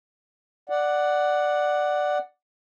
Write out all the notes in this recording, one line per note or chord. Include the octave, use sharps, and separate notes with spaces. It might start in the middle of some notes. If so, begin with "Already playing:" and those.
D5 F#5